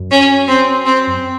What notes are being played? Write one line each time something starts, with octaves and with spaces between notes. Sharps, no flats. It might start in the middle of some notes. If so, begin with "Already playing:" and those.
Already playing: F#2
C#4
C4
C4